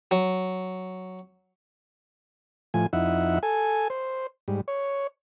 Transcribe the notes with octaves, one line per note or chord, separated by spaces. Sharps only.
F#3
A2 F3 G#5
F2 D#4 E4 E5 F#5
A4 G#5
C5
G#2 G3
C#5